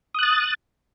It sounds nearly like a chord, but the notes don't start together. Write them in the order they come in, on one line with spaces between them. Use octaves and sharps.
D#6 F#6 A6